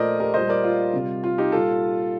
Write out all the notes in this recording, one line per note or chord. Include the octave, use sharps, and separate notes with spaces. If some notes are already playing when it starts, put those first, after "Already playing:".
Already playing: A#2 F3 A3 A#4 C5 D5 D#5
G4 A#4
A#2 G3 C5 D#5
A#4 D5
F4
C3 G3
F4
D#4 G4
A#2 G3 F4 A4